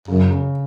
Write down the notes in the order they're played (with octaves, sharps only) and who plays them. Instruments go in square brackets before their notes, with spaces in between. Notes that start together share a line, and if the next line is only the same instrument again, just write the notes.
[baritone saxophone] F#2 [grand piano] C#3
[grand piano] C#3